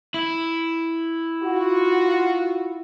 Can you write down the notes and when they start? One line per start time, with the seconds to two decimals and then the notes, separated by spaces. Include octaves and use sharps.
0.14 E4
1.43 F4 F#4